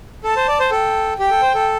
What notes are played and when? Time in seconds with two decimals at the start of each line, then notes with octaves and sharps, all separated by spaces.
0.24 A4 A5
0.36 C5
0.48 D5
0.60 C5
0.71 A4 G5
1.19 G4 G5
1.31 A4
1.42 C5
1.55 A4